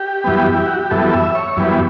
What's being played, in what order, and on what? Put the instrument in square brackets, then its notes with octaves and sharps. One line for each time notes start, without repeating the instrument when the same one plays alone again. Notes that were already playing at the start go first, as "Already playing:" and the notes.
Already playing: [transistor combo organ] G4
F#2 E3 G3 B3
E4
F#4
G4
F#2 E3 G3 B3 A4
E5
C#5
F#2 E3 G3 B3